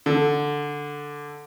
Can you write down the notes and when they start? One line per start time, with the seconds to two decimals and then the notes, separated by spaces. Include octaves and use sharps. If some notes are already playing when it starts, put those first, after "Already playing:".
0.06 D3